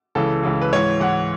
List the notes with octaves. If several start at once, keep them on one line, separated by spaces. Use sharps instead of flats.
C#2 C#3 E3 A4
C#2 C#3 E3
B4
G#2 E3 C#5
G#2 E3 F#5